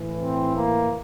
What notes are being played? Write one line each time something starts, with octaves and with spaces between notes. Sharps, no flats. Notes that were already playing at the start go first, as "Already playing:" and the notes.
Already playing: A2 E3
C4
A#3